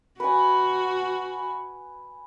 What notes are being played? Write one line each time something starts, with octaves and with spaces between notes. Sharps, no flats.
F#4 B4 G#5